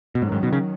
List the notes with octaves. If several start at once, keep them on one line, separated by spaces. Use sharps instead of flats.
B2
G#2 D#3 F#3 C#4
G#2
B2
C#3